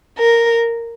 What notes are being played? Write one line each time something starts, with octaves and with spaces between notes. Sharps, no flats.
A#4